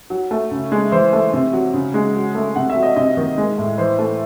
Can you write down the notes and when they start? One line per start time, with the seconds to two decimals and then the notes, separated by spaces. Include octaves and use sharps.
0.10 F#3
0.31 A3
0.51 C#3
0.72 G#3
0.92 E3 C5
1.13 A3
1.33 C3
1.53 F#3
1.74 C#3
1.94 G#3
2.15 F#3
2.35 A3
2.56 C3 F#5
2.70 E5
2.76 F#3
2.83 D#5
2.96 C3 D#5
3.17 D#3
3.38 G#3
3.58 A2
3.78 E3 C5
3.99 A3